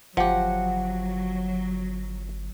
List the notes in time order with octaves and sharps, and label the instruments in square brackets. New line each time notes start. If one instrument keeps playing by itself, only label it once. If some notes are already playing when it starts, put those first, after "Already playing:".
[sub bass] G1 [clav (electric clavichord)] F3 G4 [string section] F#3 [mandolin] F#5